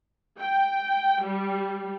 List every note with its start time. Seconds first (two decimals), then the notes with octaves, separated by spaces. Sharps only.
0.39 G5
1.21 G3